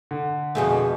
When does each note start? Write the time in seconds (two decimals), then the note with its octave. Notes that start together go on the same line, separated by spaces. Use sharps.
0.11 D3
0.55 F2 B2 A3 G#4